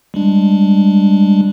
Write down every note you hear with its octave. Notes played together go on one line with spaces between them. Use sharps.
G3 G#3 D4